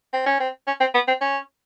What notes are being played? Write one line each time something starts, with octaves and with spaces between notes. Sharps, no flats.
C4
C#4
C4
C#4
C4
B3
C4
C#4